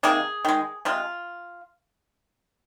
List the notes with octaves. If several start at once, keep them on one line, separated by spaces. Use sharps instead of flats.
C3 D#3 A#3 G#4
D#3 G#3
C3 G#3 F4